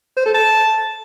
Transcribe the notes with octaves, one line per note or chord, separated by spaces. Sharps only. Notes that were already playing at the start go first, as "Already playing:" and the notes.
C5
A4
A5